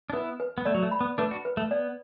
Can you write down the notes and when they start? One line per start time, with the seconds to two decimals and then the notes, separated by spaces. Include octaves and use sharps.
0.10 D4
0.13 B3 E4 B4
0.40 B4
0.58 B3
0.65 A3 D5
0.74 F#3
0.83 A3
0.91 B5
1.01 B3
1.18 A3 D4 B4
1.31 D4 F#4
1.45 B4
1.57 A3
1.71 B3 D5